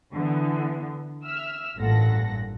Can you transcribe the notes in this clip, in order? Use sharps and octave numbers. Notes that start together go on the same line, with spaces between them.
D3 E3 B3
E5 E6 F6
A1 G2 A#2 A4 F#5 A#6